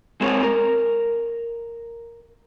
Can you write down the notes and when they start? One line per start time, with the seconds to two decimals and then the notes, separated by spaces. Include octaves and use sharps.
0.21 G#3 C4 G#4 A#4 C#5
0.43 A#4